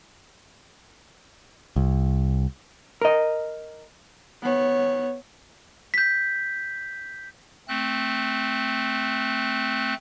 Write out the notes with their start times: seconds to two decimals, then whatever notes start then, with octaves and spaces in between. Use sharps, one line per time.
1.76 C2
3.02 A#4 D#5
4.41 B3 C#5
5.94 G6 B6
7.68 A3 C4 F#6